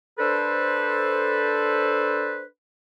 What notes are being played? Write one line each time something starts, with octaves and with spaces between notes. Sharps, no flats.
D4 A4 B4 C5